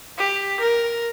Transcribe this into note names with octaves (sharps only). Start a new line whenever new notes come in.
G4
A#4